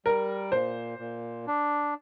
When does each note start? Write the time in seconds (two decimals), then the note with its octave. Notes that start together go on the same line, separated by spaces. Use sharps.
0.05 G3 A#4
0.52 A#2 C5
0.99 A#2
1.47 D4